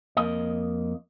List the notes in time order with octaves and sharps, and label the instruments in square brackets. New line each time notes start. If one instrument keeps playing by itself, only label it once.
[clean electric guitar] F2 A#3 D#5